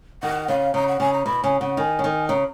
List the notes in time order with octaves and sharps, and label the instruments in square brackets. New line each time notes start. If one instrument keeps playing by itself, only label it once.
[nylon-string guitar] D#3 [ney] F#5
[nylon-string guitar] C#3 [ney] F5
[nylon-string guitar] C#3 [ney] A#5
[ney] F#5
[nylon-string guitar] C#3 [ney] G#5
[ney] A#5
[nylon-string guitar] B2 [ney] B5
[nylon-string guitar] C#3 [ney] G#5
[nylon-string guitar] C#3 [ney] F#5
[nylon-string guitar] D#3 [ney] G#5
[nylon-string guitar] C#3
D#3
[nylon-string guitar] C#3 [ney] A#5